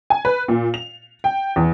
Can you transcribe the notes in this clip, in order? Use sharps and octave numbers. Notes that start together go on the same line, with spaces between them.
G#5
B4
A#2
F7
G5
E2